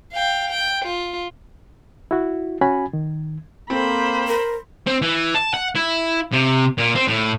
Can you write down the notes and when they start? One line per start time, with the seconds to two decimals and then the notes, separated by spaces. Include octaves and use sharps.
0.12 F5 G5
0.50 G5
0.85 F4
2.11 E4 F#4
2.61 C#4 F#4 G#5 B5
2.93 D#3
3.70 A#3 C4 A4 C5 B5
4.27 A#4
4.87 C4
5.02 E3
5.35 A5
5.54 F#5
5.75 E4
6.32 C3
6.78 A#2
6.95 C4
7.08 A2